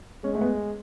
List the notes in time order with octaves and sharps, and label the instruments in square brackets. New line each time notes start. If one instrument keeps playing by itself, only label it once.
[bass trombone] G#3 [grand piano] C#4
[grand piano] A3
B3